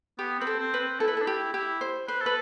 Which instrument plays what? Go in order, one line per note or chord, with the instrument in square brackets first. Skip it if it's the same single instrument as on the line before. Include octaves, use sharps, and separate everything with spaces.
[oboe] B3 [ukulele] G4
[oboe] C4 [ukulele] B4
[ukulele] A4
[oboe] C4
[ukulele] B4
[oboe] C4
[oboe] E4 [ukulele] A4
[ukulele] B4
[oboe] D4 [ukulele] A4
[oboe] E4 [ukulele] G4
[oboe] E4 [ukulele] G4
[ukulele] C5
[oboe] B4 [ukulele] C5
[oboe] A4 [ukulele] B4